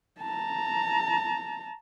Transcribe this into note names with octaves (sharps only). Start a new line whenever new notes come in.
A5 A#5